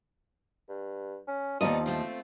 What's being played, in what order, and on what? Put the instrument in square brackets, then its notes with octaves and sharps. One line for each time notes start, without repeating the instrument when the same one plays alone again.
[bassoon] G2
C#4
[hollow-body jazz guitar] D#2 D#5 [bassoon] F3 [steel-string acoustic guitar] B3 D#4 D5
[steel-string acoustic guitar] A3 C4 F4